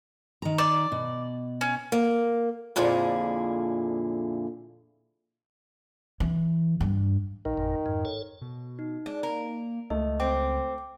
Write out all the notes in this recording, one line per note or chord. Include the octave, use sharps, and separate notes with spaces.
D#3 A#5
D5
B2
C#4
A#3
F2 A#2 D3 E4 G#4
E3
G2
A#1 A#2 D#3
G#1 F2 A#2
F2 G#2
A4 C#5
B2
D#4
G#3 D4
A#3 A#4
C#2 A3 D#5
C4 G5 D6